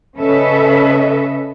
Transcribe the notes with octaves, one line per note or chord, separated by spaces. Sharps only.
C#3 C#4 A4 B4 D#5 E5